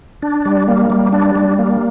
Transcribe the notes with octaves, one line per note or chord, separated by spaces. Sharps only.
D4
G3
A#3
G3
D4
G3
A#3